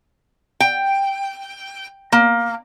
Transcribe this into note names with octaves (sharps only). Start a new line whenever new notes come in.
G5
A#3